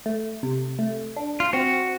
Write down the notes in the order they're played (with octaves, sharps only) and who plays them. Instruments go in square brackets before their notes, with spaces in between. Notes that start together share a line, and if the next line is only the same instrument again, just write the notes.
[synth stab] A3
C3
A3
D4
[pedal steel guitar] F4
[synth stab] C4 [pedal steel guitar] F#4